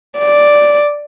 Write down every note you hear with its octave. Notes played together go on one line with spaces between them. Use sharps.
D5